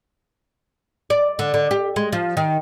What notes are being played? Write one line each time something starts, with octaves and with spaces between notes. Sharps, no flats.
D5
D3
D3
G4
G#3
F3
D#3